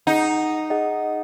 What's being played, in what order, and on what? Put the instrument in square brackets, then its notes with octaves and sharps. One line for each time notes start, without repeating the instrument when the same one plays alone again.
[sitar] D#4 [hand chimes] G#4 D#5 F#5
[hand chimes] G#4 D#5 F#5